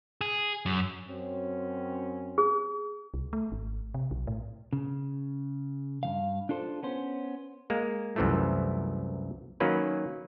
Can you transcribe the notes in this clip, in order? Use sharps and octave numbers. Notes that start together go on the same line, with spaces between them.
G#4
F#2
F#2 C4 C#4
G#4
C2
A3
G#1
C3
B1
A2
C#3
G2 E3 F5
D4 F4 A4 C5
B3 C#4 C5
G#3 A#3
C2 F#2 C3 E3 F3 A3
D#3 F#3 A#3 C#4 B4